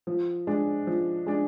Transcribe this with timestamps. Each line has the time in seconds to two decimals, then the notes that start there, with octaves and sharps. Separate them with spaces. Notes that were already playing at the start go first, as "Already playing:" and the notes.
0.07 F3
0.47 G#3 D4
0.87 F3
1.26 G#3 D4